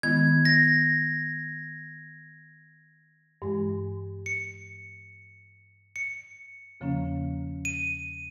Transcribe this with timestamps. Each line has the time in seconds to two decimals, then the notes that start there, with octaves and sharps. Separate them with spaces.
0.03 D#3 G#3 B3 E4 G#6
0.45 A#6
3.42 G2 E3 G#3
4.26 C#7
5.96 C#7
6.80 E2 C#3 F3 A#3 C#4
7.65 D#7